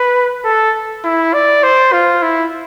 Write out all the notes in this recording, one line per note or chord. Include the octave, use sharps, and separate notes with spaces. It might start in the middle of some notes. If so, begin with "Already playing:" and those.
Already playing: B4
A4
E4
D5
C5
F4
E4